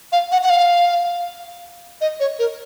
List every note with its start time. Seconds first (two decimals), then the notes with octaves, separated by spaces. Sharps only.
0.12 F5
0.32 F#5
0.43 F#5
0.50 F5
2.01 D#5
2.20 C#5
2.39 A#4